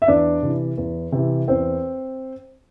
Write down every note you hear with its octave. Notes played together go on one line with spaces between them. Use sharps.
E5
E2 D4 D5
C3 E3
E2
C3 E3
E2 C4 C5